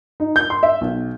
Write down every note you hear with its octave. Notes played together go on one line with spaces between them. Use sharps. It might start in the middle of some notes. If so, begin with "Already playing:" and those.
D#4
G6
C6
E5
B1